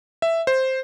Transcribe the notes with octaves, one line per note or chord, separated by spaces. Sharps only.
E5
C5